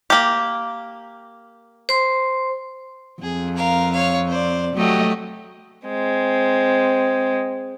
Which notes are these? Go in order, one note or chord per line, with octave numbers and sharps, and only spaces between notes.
A#3 G4
C5 C6
F2 G#4
A#4 F5
C#5 F5
C5 D5
F#3 A3 F#4 G4 D#5
G#3 C4